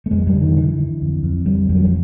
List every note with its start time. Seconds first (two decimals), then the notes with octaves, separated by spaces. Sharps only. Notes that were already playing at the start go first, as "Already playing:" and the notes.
0.06 A3
0.11 F2 G#3
0.27 G3
0.34 D3
0.41 D#3
0.56 D3 E3
0.78 D3
1.02 F2
1.23 F2
1.46 D3 G3
1.69 F2 G3
1.77 F#3
1.85 F3